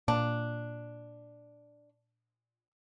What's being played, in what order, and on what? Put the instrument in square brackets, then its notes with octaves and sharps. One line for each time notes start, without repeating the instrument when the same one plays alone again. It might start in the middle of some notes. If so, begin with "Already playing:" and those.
[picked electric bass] A#2 [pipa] D4